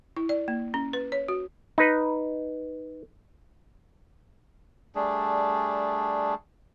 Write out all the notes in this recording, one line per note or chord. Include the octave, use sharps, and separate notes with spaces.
E4
D5
A#3
C#4
B4
C#5
F#4
D#4 B4
G3 A3 D4 G#4